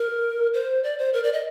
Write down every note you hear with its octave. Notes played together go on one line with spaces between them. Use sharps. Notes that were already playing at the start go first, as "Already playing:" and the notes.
Already playing: A#4
C5
D5
C5
A#4
D5
D#5